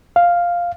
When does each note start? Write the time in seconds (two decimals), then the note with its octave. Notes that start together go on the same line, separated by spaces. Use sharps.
0.16 F5